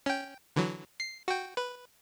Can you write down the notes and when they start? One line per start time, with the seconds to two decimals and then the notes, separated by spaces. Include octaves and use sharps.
0.06 C#4 G5
0.56 D3 E3 F#3
1.00 C7
1.28 F#4 G5
1.57 B4